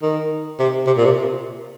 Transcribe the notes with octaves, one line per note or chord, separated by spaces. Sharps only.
D#3
C3
C3
A#2
C3